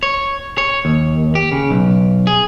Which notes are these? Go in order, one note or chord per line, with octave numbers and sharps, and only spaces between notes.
C#5
C#5
D#2
G4
C#3
B1
G#4